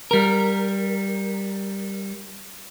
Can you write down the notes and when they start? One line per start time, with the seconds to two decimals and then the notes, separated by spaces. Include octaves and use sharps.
0.11 G3 A#4